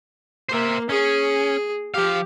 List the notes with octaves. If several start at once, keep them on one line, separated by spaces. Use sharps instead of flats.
A#3 C5 E5
C#4 G#4
F3 G4 F5